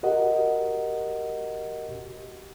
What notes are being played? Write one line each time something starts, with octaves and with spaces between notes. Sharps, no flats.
F#4 G4 A#4 D#5 F#5